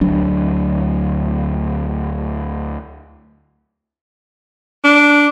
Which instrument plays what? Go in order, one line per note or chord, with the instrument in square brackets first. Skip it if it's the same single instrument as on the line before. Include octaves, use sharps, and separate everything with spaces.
[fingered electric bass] D2 F#3 D4
[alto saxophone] D4